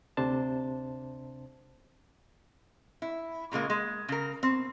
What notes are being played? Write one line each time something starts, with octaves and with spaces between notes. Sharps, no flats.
D2 C3 D4 C5 A5
E4
A#2 C#3 G#3 A#3
G#3
C#3 A#4
C4